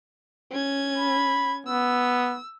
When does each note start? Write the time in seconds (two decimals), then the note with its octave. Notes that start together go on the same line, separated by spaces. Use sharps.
0.51 C#4 G#6
0.98 B5
1.67 B3 E6